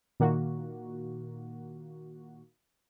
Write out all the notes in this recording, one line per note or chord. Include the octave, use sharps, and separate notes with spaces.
A#2 D#3 A#3 F#4